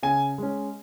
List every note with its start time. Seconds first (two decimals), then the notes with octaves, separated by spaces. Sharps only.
0.03 C#3 G#5
0.38 G#3 C#4